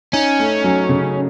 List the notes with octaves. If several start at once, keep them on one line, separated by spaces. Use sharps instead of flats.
C#4 D#4
A3
F#3
C#3